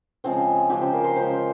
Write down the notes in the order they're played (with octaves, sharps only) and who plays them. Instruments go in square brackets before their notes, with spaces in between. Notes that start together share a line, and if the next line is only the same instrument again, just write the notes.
[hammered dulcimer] C#3 F3 G#3 C4
C#3 F3 G#3 G4
C5
A#4
C5
C#3 F3 G#3 C5